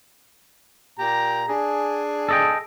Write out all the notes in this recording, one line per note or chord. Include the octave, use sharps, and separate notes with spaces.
A#2 G4 A#5
D4 G#4
A4 D#5 G5